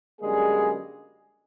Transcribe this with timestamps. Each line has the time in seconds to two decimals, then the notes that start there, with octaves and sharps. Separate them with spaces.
0.21 F#2 D3 G3 G#3 A#3 G#4